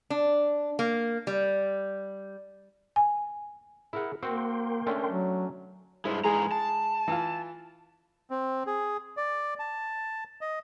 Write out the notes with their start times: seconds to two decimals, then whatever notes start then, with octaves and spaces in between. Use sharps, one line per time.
0.10 D4
0.79 A#3
1.27 G3
2.96 G#5
3.93 E4 G#4 A#4 F#5
4.23 A#3 C4 F#4 A#4 G5 C6
4.86 A3 C#4 D4
5.08 F#3
6.05 G2 G#3 E4 C5
6.24 G#2 E3 G#3 G#4 A#5
6.52 A5
7.08 E3 F4
8.30 C4
8.67 G#4
9.17 D5
9.59 A5
10.41 D#5